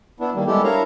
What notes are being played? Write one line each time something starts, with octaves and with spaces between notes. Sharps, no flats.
B3 D4 E4
D#3 G3 A#3
G3 G#3 B3 E4 G4 A4
D4 E4 A#4 C#5 F5 A#5